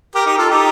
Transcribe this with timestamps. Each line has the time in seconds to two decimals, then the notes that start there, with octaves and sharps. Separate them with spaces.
0.15 G4 A#4
0.26 D#4 G4
0.38 F4 A4
0.50 D#4 G4